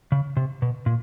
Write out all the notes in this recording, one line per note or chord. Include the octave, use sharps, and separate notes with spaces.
C#3
C3
B2
A#2